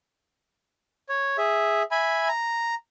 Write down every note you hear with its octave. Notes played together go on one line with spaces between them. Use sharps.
C#5
G#4 E5
E5 G#5 B5
A#5